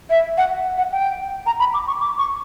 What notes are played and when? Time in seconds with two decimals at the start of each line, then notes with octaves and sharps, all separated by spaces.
0.10 E5
0.38 F#5
0.78 F#5
0.92 G5
1.46 A#5
1.59 B5
1.74 D6
1.87 C#6
2.00 D6
2.18 C#6